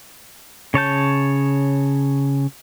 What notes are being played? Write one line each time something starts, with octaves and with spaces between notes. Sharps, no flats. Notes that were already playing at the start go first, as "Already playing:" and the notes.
C#3 C#5 A5 G6